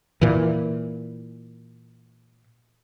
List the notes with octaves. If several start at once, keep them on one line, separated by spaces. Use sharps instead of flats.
A#2 E3